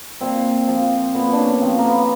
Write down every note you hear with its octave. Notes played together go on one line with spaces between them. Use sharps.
A#2 C4
F3
A#2 B3
D4
C#4
F3 C4
A#3
B3